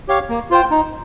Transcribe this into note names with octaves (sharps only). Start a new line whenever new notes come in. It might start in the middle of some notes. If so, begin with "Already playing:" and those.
G4 C#5 F5
A#3
F4 C5 G5
D#4